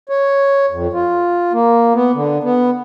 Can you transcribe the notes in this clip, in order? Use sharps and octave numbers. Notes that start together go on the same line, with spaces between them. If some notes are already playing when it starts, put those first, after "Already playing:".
C#5
F2
F4
A#3
B3
D3
B3